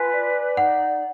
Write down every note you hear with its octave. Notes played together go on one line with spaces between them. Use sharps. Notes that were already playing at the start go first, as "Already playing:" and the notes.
Already playing: F4 B4 G#5
D5
D#4 F#5